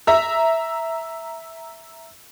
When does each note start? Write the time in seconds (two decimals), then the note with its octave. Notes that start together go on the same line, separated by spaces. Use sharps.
0.07 E5 A#5 E6